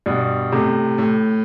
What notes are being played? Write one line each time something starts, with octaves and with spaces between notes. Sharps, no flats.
G2 B2
A2 C3
A2